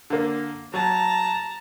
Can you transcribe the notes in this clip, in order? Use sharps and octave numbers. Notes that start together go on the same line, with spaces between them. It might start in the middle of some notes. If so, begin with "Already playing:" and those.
D3 A#3
F#3 A5 A#5